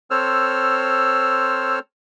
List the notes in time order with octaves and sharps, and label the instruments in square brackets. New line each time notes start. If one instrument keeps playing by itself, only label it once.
[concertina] C4 A4 C5 C#5 E6 F6